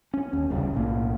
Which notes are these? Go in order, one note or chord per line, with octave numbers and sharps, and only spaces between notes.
C#4
D#2
E1 C2 C#3 G3
B1 A2 A#3